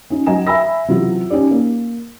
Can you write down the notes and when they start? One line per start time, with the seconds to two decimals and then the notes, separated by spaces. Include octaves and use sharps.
0.10 C#4 D#4
0.26 F#3 D#5 G#5 A#5 E7
0.47 E5 G#5 A#5 B5 E6 A#6
0.88 C3 E3 F#3 E4 F4
1.30 C#4 D#4 G4 D5
1.51 A#3